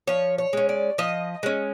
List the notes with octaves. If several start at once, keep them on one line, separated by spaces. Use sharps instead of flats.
F3 C#5
C#5
G#3 C#4
D5
F3 D#5
G#3 C#4